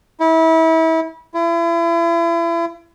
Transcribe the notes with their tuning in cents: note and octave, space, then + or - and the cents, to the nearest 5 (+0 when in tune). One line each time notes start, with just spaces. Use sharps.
E4 -30
E4 +35